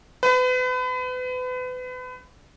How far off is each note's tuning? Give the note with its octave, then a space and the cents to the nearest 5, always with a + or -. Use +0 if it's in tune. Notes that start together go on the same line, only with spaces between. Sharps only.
B4 +35